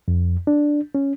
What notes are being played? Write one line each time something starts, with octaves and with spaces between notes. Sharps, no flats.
F2
D4
C#4